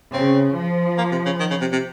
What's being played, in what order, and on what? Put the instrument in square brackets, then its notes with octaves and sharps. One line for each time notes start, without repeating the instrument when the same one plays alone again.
[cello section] C#3 [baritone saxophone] C4
[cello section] F3
[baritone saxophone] A#3
C3
C#3
D#3
C#3
C3
C3